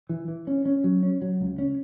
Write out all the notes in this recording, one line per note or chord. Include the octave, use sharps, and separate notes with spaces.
E3
E3
C#4
C#4
F#3
C#4
F#3
C#2
C#4